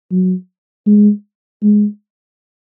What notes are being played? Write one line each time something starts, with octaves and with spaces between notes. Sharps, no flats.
F#3
G#3
G#3